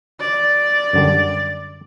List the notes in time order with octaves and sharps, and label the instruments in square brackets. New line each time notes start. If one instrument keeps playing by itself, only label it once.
[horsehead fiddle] D5
[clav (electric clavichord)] F#2 D3 G3